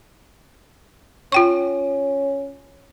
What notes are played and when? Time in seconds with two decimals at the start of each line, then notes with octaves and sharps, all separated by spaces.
1.32 C#4 F4 G5 C#6